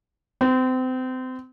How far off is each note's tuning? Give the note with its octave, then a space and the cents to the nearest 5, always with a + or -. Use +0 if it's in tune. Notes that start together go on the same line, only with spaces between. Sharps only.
C4 -30